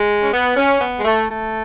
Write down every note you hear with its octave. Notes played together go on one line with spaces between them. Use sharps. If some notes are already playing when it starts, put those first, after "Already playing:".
Already playing: G#3
C#4
B3
C#4
B3
G#3
A3
A3